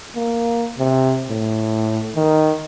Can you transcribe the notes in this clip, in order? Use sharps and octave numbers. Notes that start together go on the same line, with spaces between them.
A#3
C3
A2
D#3